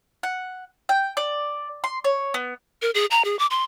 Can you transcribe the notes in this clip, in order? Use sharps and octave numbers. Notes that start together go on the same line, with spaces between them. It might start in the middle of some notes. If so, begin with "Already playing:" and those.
F#5
G5
D5
C6
C#5
B3
A#4
G#4
A#5
G#4
D6
C6